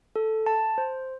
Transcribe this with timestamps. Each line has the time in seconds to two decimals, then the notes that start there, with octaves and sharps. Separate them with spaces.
0.16 A4
0.46 A5
0.78 C5